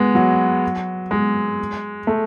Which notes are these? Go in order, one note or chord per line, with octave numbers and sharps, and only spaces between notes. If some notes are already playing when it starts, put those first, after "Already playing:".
Already playing: G#3 B3
F#3
G#3
A3